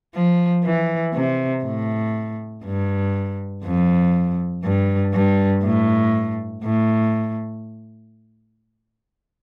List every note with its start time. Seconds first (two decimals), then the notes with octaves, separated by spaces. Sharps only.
0.14 F3
0.64 E3
1.14 C3
1.64 A2
2.64 G2
3.64 F2
4.64 G2
5.13 G2
5.64 A2
6.64 A2